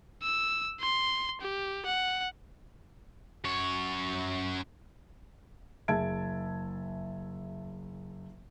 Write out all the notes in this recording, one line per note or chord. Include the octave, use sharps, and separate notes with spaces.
E6
C6
G4
F#5
F#2 C#5
F#1 G#4 E5 A5 G#6 D7